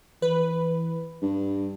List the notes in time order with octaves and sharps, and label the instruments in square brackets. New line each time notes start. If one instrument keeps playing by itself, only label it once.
[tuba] E3 [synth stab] B4
[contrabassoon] G2 [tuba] G3